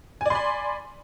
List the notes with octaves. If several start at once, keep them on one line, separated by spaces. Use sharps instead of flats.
D5 G#5 B5 C6